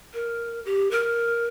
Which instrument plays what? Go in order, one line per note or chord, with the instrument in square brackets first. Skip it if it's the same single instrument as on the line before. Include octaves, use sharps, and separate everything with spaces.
[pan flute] A#4
G4
A#4